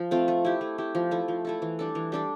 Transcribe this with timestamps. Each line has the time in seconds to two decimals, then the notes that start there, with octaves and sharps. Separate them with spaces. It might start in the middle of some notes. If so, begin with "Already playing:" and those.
Already playing: F3
0.11 A3 C4 F4
0.28 A3
0.45 E4 G4
0.61 A3
0.78 E4 G4
0.95 F3
1.11 A3 E4 A4
1.28 F3
1.45 A3 E4 A4
1.62 E3
1.79 G3 D4 A4
1.95 E3
2.12 G3 D4 A4